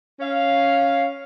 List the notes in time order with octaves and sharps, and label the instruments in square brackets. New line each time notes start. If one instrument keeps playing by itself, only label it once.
[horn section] C#4 F5